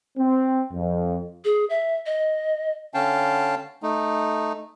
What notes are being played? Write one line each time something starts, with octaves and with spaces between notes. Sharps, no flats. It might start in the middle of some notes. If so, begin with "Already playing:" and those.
C4
F2
G#4
E5
D#5
D3 C#4 F5 G5 A5
A3 D#4